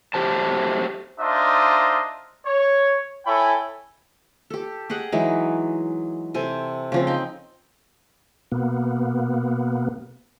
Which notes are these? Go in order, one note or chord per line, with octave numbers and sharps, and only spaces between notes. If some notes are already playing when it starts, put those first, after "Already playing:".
F#3 A3 G4 C5 A5
D4 D#4 F4 C5 D#5 E5
C#5
E4 A4 C#5 G5 G#5 B5
G4 A4
G4 G#4 D#5 F#5
E3 F#3 G#3 D#4
C3 A4 C5 G#5
C#3 F3 C4
D#4 G5
B2 A#3 B3